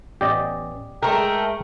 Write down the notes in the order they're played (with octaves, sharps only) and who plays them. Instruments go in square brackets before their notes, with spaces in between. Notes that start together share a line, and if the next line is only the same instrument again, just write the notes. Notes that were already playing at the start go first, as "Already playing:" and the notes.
[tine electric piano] A1 B3 C#4 [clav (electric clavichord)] G4 D5 D#5
[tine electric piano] G#3 G#4 [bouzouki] A3 A#4 [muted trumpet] G5